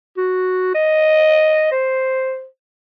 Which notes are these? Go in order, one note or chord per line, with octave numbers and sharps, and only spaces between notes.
F#4
D#5
C5